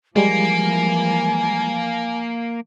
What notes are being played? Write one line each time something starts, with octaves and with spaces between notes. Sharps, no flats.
E3 F3 G3 G#3 A#3 G#5